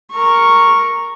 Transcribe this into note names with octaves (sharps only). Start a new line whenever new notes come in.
A#4 C#6